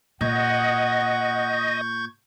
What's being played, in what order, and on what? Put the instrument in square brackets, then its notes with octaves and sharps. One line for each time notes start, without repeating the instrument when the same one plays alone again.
[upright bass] A#2 [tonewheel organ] D#5 [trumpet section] F#5 [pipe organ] C#6 G6 G#6